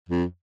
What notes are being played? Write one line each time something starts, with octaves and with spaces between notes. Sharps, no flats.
F2